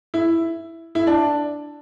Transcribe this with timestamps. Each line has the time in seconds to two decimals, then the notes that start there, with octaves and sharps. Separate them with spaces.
0.14 E4
0.95 E4
1.07 D4